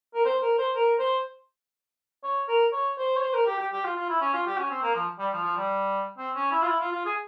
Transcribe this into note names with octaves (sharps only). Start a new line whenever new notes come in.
A#4
C5
A#4
C5
A#4
C5
C#5
A#4
C#5
C5
C#5
C5
A#4
G4
G4
G4
F4
F4
E4
C#4
F4
G4
C#4
C4
A#3
F3
G3
F3
F3
G3
C4
C#4
E4
F4
E4
F4
F4
G#4